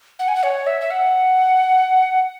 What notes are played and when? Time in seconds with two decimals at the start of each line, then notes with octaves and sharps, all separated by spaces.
0.19 F#5
0.28 G#5
0.35 F#5
0.43 C#5
0.67 E5
0.81 E5
0.91 F#5